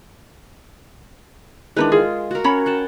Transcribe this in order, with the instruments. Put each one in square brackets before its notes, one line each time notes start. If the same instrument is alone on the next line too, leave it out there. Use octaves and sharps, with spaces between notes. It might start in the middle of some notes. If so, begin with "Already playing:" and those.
[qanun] D#3 E3 G#3 [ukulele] D4 D#4 B4
[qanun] F4 [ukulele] G#4
[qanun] F#4 A#4
[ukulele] C#4 F#4 B5 [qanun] C#5
[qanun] F#5 G5 A5